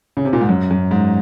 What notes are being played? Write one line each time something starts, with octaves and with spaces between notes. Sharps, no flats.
C#3
C3
A#2
G#2
F#2
F#2
G#2